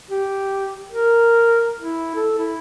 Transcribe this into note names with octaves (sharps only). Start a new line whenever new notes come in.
G4
A#4
E4
A4
E4